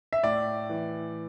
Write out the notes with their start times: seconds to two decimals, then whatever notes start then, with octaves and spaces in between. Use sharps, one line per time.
0.13 E5
0.23 A2 D5
0.70 E3